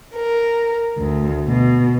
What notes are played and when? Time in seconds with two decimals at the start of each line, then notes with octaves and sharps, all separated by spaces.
0.16 A#4
0.98 D2
1.48 B2